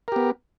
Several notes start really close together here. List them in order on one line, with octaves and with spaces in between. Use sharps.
A#4 G4 B3